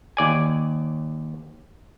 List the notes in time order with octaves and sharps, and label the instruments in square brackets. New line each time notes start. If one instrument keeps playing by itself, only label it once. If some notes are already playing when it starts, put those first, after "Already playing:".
[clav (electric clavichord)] D#2 D5 G#5